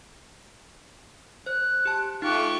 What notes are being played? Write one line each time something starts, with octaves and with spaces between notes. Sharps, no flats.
C5 F#6
G4 A5
A3 D#4 F4 G4 C#6 F#6